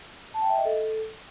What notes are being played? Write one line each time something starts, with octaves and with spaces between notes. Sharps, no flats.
A5
G5
E5
D#5
A4